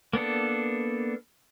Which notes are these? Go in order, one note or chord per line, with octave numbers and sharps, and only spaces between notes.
A#3 B3 D4 A4